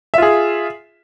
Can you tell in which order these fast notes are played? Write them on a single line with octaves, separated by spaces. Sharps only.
E5 F4 G#4